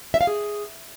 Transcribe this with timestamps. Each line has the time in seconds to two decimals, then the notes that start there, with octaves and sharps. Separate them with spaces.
0.14 E5
0.21 F5
0.27 G#4